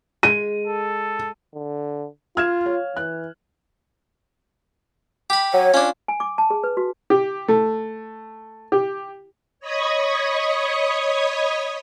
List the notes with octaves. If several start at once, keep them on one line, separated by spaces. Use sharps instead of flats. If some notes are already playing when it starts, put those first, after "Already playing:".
G#3 D#7
A4
D3
F4 F6 G#6 E7
C#5 F5
E3 F#6
G4 B5
F#3 C#5
C#4 D4 F4
G#5
D6
A5
G#4
B4
F#4
G4
A3
G4
C#5 D#5 B5 C#6 D#6 G#6